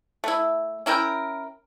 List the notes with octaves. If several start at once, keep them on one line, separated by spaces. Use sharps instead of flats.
A3 E4
C#4 E4 A#4 G5